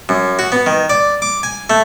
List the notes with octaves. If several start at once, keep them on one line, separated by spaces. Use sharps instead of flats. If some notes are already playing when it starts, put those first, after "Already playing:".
F#2
F#4
B3
D#3
D5
D6
G#5
A3